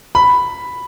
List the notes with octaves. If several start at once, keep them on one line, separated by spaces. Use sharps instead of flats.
B5